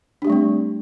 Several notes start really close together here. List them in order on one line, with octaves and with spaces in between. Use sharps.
D4 G4 A3 G3 C4